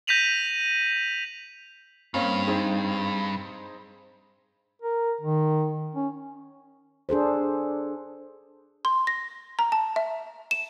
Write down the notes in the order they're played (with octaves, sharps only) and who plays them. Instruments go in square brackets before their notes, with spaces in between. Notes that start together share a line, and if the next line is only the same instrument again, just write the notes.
[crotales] G6 A#6 B6 D#7 F7 F#7
[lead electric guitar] G2 [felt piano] A#3 C4 C#4
[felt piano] C4 D#4 G#4
[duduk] A#4
D#3
C#4
[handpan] D4 G#4 A4 C5
[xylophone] C6
A#6
A#5
A5
E5
E7